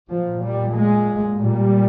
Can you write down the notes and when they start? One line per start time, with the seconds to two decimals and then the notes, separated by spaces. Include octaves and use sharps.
0.11 A#2 F3
0.44 G3
0.76 G#3
1.41 A#2 G3